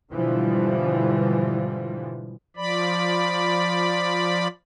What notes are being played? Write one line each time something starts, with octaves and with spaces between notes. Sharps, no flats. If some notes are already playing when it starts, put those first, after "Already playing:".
G#2 B2 D3 E3 F3 G3
F3 D5 B5